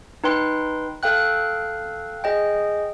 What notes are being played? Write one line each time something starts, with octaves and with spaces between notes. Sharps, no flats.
D#4 B4 G5 C6
A4 F5 G5 F#6
G#4 D#5 G5